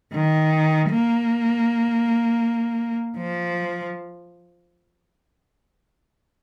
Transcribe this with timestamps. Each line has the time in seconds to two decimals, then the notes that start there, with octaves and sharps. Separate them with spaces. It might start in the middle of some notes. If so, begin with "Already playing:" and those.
0.13 D#3
0.89 A#3
3.16 F3